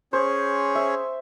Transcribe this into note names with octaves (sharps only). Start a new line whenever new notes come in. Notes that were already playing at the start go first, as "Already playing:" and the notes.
C#4 G#4 C5 C#5
E5